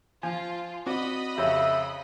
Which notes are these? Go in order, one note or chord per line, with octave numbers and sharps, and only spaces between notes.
F3 F4 G#5
C4 F#4 D5 D#5 B5
F2 C#3 G4 C#5 E5